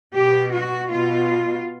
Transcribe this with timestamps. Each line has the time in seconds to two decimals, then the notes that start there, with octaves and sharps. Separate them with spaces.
0.16 B2 G4
0.54 F#4
0.91 B2 F4